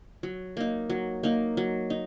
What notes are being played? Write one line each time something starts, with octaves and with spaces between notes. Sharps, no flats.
F#3
A#3 D#4
F#3
A#3 D#4
F#3
D#4